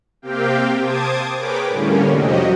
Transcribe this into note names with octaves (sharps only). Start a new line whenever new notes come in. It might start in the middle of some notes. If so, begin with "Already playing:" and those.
C3 A#3 C4 G4 F5 G5
C5 A5 D6 D#6 G#6
G#4 A#4 B4 C#5 G5 D6
A2 D3 G3 A#3 C#4
F2 C3 F#3 F#4 G4 D#5